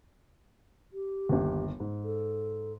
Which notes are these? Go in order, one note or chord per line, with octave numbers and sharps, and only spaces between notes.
G4
G1 D#2
G#2
A4